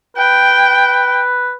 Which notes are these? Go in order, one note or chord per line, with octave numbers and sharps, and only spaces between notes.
B4 G5